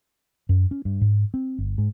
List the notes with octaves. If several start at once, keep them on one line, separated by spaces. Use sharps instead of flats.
F#2
C#4
G2
G#2
C4
G1
G#2